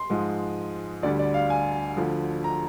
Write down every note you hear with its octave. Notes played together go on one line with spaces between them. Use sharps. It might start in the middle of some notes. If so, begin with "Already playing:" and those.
Already playing: C6
G#2 F3 G#3
D2 D3 G3 D5
D5
F5
G#5
D2 D3 F3
A#5